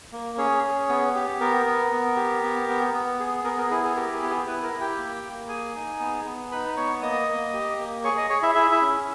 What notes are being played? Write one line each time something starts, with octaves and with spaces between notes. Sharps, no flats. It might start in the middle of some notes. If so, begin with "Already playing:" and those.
A#3
C#4 G#4 C#5
G#4
B3
G4
B3 A#4
B3
B3
G4
B3
B3
B3
G#4
B3 A#4
A#4
E4 G#4
G#4
G4 A#4
G#4
B3
G#4
B3 E4 B4
A#4
E4
G4 G5
A#3
A#3
G#4 G#5
D#4
B3
B3
D#4 B4 B5
B3 C#5 C#6
A#3 D#5 D#6
A#3
G4
A#3
G#4 C#5 C#6
D#5 D#6
G#4 C#5 C#6
E4 E5
E4 G#4 E5
E4 E5
C#4